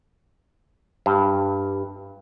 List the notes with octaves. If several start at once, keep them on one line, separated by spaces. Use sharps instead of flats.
G2